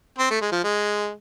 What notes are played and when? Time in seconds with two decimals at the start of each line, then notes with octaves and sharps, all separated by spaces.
0.19 C4
0.31 A3
0.41 G#3
0.52 F3
0.64 G#3